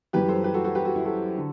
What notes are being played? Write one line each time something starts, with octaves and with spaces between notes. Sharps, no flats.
F#2 E3 G3 G4 B4
A4 C5
G4 B4
F#4 A4
F#4 A4
G4 B4
F#4 A4
E4
F#4 A4
D3